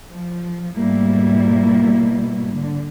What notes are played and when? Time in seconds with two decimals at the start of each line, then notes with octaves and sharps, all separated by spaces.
0.12 F3
0.77 G#2 B2 G3 A3 A#3 E4
2.54 D3